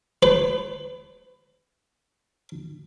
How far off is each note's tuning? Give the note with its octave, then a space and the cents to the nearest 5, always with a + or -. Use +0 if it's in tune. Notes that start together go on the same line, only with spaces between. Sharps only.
B4 +30